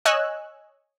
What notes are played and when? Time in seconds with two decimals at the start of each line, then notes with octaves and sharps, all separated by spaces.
0.05 C#5 D#5 G#5 E6 F#6